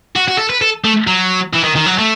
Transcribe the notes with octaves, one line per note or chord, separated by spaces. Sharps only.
F#4
F#4
A4
B4
A4
A3
F#3
E3
D#3
D#3
F#3
A3